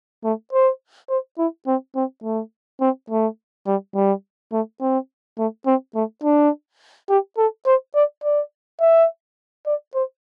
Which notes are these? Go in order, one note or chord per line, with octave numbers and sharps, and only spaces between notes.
A3
C5
C5
E4
C4
C4
A3
C4
A3
G3
G3
A3
C4
A3
C4
A3
D4
G4
A4
C5
D5
D5
E5
D5
C5